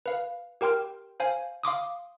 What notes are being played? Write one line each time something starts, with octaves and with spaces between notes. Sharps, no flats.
B4 F5
G4 A#4 G5 C6 F6
C5 F5 G#5
F5 C6 D6 D#6